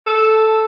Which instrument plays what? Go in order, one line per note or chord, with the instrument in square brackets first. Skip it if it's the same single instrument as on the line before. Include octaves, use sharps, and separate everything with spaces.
[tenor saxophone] A4